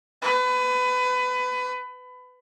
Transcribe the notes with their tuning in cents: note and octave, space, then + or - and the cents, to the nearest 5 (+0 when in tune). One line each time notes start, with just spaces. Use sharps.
B4 +25